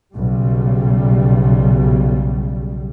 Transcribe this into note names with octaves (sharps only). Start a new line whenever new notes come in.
B1 C#3 G3